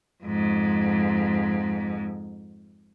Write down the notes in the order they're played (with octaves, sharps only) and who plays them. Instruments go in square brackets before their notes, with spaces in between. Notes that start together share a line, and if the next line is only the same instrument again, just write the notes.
[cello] F2 G#2